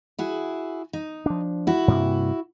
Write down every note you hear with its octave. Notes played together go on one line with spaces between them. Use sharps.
E4 F#4 G#4
D#4
F3 D4
E4 F#4
G2 C3 A#3